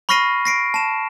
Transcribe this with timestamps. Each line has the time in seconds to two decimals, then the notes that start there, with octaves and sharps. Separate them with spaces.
0.09 B5 C#6 F6 A#6 C7 D#7
0.45 A#6 C7 D7
0.74 A5 E7